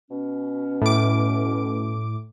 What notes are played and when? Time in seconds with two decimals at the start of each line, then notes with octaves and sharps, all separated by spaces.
0.11 B2 C#4
0.82 A2 D6